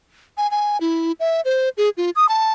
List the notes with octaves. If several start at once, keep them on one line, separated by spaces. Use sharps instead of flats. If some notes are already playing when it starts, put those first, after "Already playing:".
G#5
G#5
E4
E5
C5
G#4
F4
D#6
A5